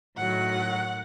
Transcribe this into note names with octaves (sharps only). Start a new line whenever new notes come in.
A2 D#3 F#3 F#5